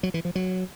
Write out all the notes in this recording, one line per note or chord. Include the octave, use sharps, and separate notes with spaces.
F#3
E3
F3
F#3